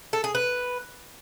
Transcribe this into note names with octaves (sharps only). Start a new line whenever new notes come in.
A4
G#4
B4